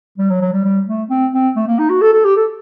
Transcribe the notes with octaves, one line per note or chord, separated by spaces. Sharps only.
G3
F#3
F#3
G3
G3
A3
C4
C4
A3
A#3
D#4
F#4
A4
A4
G4
A4